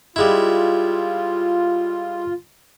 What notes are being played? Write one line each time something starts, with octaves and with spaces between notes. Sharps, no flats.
G3 G#3 E4 F4